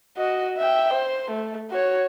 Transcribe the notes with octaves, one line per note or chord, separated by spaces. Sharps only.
F#4 D#5
E5 G5
C5
A3
F#4 C#5